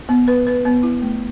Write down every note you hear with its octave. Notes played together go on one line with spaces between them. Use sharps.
B3
B4
B4
B3
E4
A3